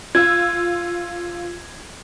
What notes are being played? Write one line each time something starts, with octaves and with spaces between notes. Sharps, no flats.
F4 E6 G#6